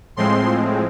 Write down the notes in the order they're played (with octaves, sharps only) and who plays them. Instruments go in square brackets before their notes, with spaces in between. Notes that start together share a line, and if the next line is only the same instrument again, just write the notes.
[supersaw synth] A2 F3 G#3 C4 C6